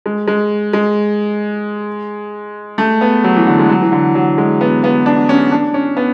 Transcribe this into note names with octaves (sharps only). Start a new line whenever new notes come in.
G#3
G#3
G#3
A3
B3
F#3
E3
D3
G#3
F#3
E3
D3
F#3
G#3
B3
B3
D4
C#4
D4
C#4
B3